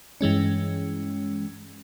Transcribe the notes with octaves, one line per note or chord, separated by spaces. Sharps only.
G2 E3 G#3 C#4